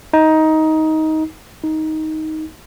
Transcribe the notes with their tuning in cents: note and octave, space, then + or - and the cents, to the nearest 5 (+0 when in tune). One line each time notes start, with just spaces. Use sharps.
D#4 +15
D#4 +10